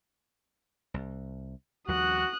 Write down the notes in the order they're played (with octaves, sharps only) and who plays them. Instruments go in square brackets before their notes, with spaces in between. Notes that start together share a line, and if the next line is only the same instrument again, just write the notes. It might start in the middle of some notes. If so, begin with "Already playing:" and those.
[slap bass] C2
[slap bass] D#2 F3 G3 [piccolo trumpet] F#4 [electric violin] D#6 F#6